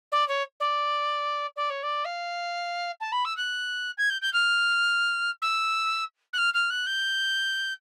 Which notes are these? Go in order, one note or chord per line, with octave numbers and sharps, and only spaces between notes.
D5
C#5
D5
D5
C#5
D5
F5
A5
B5
E6
F#6
G#6
G6
G6
F6
E6
F#6
F6
F6
F#6
G6